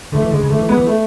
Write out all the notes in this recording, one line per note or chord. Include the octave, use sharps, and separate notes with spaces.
D3 A3
E3
D3 G#3
C#3
D3 A3
E3
G#3 B3
E3
A3